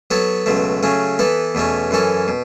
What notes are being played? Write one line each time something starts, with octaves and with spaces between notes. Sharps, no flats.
F#3 B3 A4 C#5
C#2 B2 F#3 A3
C#3 F#3 A3 C#4
E3 B3 A4
E2 B2 A3 C#4
F#2 E3 C#4 A4
B2